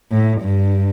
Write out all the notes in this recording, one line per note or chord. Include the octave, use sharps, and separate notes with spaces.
A2
G2